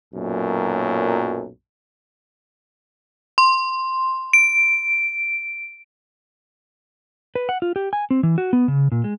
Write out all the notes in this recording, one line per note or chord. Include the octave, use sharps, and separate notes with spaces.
B1 F#2 A#2
C6
D7
B4
F#5
F4
G4
G#5
C4
E3
F#4
B3
C#3
A#2
G#3